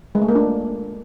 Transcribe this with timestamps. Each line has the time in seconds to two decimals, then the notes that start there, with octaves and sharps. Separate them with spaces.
0.15 G#3
0.22 A3
0.28 A#3
0.35 D4